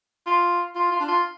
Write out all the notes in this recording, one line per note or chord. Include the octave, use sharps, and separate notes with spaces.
F4
F4
F4
D4
F4